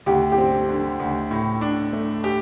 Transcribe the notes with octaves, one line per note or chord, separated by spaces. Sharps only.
D2 G4
G4
C4
D3
D2
A2
D4
A3
G4